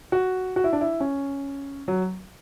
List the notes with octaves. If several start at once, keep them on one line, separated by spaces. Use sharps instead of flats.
F#4
F#4
E4
D4
E4
C#4
F#3